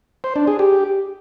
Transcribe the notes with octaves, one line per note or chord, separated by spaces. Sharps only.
C5
D4
G#4
G4